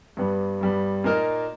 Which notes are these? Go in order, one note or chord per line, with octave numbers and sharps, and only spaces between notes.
G2 G3 B3
G2 G3 B3
A#2 A#3 D#4 A#4